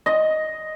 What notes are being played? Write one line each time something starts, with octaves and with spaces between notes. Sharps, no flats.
D#5